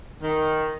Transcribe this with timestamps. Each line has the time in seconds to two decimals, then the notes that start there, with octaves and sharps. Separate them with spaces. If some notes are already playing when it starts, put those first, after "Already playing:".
0.22 D#3